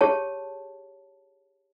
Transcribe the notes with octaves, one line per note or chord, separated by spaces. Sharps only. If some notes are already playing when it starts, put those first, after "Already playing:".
G4 G#4 C#5 A5